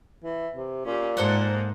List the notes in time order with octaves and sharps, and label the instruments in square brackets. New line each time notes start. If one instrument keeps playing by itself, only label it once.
[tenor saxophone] E3
C3
[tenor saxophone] A#2 [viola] C#4 G4
[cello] G#2 [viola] G#3 A#3 [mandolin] A4 C5 F#5